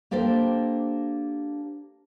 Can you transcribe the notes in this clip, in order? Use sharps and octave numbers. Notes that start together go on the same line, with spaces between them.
A#3 D4 G4 A4 C5